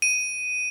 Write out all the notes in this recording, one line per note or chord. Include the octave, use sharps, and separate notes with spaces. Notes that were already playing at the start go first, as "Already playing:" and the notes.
D#7